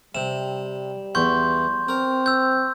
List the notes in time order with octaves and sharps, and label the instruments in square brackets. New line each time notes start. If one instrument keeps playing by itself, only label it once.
[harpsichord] C3 [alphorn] G3 [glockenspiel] E7
[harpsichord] E2 [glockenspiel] C6 C#6 G6
[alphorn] C4 [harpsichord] A#4
[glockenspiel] E6 G6